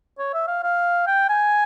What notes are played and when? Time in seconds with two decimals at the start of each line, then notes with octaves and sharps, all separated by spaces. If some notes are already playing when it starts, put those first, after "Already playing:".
0.19 C#5
0.34 E5
0.48 F5
0.63 F5
1.07 G5
1.29 G#5